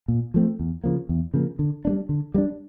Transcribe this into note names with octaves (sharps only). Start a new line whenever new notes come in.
A#2
F3 A3 C4
E2
C#3 F3 A#3
E2
C#3 F3 A#3
D3
G3 A#3 D4
D3
G3 A#3 D4